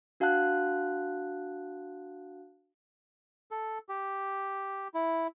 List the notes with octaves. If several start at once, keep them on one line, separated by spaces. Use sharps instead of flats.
D4 F#4 F5 F#5 A5 F#6
A4
G4
E4